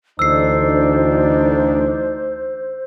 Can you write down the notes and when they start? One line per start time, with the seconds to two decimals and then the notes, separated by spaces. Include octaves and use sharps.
0.19 D2 E3 D4 D#4 C5 E6 C7